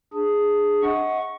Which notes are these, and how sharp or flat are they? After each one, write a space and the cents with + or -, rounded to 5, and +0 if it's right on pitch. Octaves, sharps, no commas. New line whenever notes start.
D4 +10 G#4 +0
D#5 +35 F#5 +0 C#6 +0